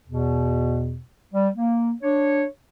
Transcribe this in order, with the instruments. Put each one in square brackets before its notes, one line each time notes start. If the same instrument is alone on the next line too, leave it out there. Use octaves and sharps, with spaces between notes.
[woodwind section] E2 B2
G3
A#3
D4 C#5